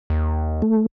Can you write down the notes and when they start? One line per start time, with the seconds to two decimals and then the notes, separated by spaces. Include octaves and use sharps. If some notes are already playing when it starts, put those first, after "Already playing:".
0.10 D#2
0.62 A3